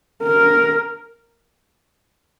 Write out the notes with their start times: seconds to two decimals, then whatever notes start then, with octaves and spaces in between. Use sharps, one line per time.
0.23 A#4